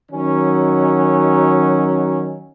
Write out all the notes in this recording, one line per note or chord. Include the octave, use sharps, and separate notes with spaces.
D#3 F#3 C#4